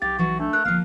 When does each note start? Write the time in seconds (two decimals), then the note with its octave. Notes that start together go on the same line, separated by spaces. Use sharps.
0.02 B1 G4 F5 A6
0.18 E3 F#3 F#4
0.40 A3 D4
0.53 A#4 F#6
0.65 G1 F3 A#3 F5